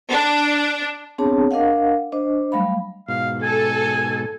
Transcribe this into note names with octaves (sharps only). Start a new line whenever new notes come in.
D4
B3 C4 D4 G#4 C#5 A5
D4 A#4 D#5 F5 F#5
D4 C5 D#5
F#3 G3 A3 F5 B5
G#2 B2 F5
A4 G#5